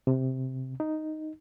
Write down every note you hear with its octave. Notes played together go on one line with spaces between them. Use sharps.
C3
D#4